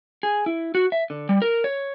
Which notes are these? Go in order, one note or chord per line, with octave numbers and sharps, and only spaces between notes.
G#4
E4
F#4
E5
D3
G3
A#4
C#5